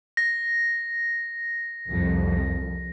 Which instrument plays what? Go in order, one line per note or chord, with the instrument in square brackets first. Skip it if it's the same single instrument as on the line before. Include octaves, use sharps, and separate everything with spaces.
[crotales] A#6
[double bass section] C2 F2